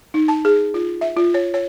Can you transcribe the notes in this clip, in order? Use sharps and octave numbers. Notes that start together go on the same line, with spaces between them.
D#4
A5
G#4
F4
E5
F4
C#5
C#5